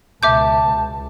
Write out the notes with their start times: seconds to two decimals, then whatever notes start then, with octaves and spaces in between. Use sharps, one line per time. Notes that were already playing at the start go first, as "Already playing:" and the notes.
0.23 C#2 B2 E5 A5 D6 G6
0.69 C#2